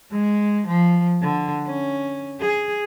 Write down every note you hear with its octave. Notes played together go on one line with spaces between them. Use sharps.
G#3
F3
D3
C#4
G#4